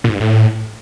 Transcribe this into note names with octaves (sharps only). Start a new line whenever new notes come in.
A#2
G#2
G2
A2